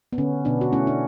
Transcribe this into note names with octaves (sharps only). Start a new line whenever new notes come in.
B3
D3 C#4
B2 B3 D4
F#4
A3 C#4 E4
D4